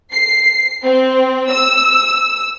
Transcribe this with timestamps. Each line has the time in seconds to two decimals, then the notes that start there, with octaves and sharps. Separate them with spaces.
0.12 C7
0.85 C4
1.51 E6